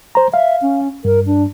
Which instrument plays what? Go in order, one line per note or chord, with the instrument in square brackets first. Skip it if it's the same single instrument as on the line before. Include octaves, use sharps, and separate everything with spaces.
[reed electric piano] C5 A#5
[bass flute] E5 [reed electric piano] F5
[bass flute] C#4
[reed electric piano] G2 [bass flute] A#4
[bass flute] D4